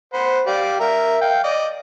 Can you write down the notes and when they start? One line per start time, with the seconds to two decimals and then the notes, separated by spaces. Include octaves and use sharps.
0.14 C5 F#5 B5
0.46 G4 D5 F5
0.80 A#4 E5
1.21 F5 G5
1.44 D5 D#5